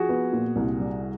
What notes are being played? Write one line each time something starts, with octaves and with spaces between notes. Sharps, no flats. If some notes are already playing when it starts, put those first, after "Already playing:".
Already playing: F3 F#4 G#4
B3
A#2
C2
G3